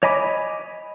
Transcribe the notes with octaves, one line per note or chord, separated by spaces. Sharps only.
C#5 D#5 G#5 B5 D6